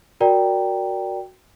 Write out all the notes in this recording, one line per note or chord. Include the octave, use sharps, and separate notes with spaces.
F#4 A#4 D5 G5 A#5